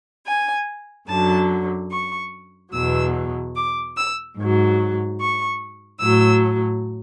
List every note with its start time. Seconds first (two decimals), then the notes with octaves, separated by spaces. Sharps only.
0.26 G#5
1.08 F#2 D3 F#3 A5
1.90 C#6
2.72 E2 B2 F#3 E6
3.55 D6
3.97 E6
4.37 G#2 F#3
5.20 C#6
6.01 A2 F#3 E6